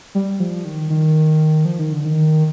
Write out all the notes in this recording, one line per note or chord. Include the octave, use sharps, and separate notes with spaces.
G3
F3
D#3
D#3
F3
D#3
D3
D#3